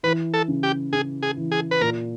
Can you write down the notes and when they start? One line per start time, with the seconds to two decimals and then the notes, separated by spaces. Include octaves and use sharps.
0.03 E3 B4
0.34 A4
0.48 C#3
0.63 G4
0.93 C#3 G#4
1.23 G#4
1.37 E3
1.52 G#4
1.71 B4
1.81 A#2 A#4